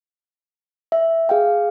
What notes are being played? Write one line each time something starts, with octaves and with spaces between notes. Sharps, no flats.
E5
G#4 F5 G5